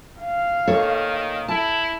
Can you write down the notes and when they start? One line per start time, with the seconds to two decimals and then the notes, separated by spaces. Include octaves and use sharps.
0.20 F5
0.67 A#2 D#3 A4 C#5
1.48 E4 A5